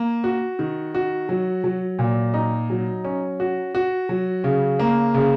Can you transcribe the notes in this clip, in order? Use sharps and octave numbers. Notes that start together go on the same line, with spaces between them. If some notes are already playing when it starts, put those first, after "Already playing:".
Already playing: A#3
F#4
D#3
F#4
F#3
F#3
A#2
D#4
F#3
C#4
F#4
F#4
F#3
C#3
A#3
C#3